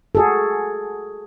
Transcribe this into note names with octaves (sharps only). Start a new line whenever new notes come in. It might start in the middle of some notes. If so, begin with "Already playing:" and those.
F#4 G#4 A4